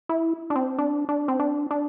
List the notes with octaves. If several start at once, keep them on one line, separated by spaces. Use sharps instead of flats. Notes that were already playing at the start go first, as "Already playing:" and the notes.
E4
D4
C4
D4
D4
C4
D4
D4